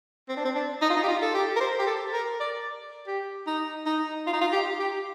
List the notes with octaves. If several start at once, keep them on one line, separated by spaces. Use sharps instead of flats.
C4
D4
C4
D4
D#4
F4
D#4
G4
F4
A4
G4
A#4
C5
G4
A4
A#4
D5
G4
D#4
D#4
F4
D#4
F4
G4
G4